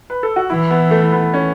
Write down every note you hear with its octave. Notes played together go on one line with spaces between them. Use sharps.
B4
A4
F#4
E3 E4
B3
A3
B3
C#4